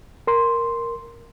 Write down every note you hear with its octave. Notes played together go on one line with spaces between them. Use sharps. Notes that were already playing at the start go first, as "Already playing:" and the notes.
A#4 C6